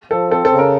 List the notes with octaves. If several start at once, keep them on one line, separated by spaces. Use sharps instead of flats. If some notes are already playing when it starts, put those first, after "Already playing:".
F3 A4
C4 A4
A4
C#3
A#4